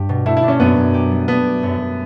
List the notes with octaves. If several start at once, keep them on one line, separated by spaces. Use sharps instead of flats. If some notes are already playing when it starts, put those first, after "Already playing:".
Already playing: G2 G4
B2
A3 E4
E4
D4
C#4
F#2 B3
F#2
G4
G3
A3 B3
G4
F#2
F#2